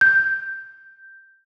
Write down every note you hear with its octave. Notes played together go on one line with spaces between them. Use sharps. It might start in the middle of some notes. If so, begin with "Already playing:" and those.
G6